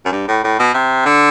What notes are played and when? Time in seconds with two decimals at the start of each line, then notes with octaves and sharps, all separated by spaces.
0.05 F#2
0.12 G2
0.28 A2
0.44 A2
0.59 B2
0.74 C3
1.05 D3